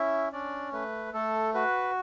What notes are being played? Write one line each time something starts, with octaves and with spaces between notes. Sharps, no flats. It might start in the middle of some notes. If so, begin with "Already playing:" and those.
Already playing: C#4 E4 E5
C#4 D4 D5
A3 B4
A3 A4
F#4 B4